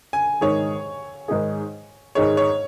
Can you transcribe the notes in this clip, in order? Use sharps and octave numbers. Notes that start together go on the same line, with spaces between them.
G#5
G#2 D#3 G#3 D#4 G#4 C#5
G#2 D#3 G#3 D#4 G#4
G#2 D#3 G#3 D#4 G#4 C#5
C#5